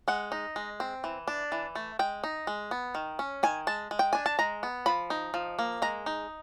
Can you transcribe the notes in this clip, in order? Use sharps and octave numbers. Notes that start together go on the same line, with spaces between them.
G#3 F#5
D#4
G#3
C4
E3
D4
E3
A3
G#3 G5
D#4
G#3
B3
D#3
C#4
D#3 G#5
G#3 A5
G#3
G5
D4 G#5
A5
G#3 A#5
B3
F3 B5
D#4
F3
A#3
G#3 A#5
D#4